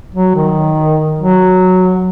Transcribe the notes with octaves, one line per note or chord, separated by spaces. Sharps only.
F#3
D#3
F#3